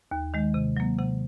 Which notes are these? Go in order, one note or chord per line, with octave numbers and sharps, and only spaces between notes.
D#2
D#3 G#3
C3
F#3 A#3
C3 F#5